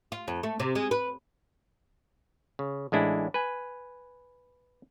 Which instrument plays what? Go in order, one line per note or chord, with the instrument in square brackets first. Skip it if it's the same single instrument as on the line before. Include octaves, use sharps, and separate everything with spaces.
[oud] F4
F2
A3
C3
G#3
B4
[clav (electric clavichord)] C#3
A1 G#3 D4 E4
B4 G#5